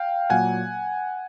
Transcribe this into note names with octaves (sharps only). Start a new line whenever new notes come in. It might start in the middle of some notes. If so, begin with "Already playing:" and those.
Already playing: F5 G5
A#2 F#3 A#3 F#5 G#5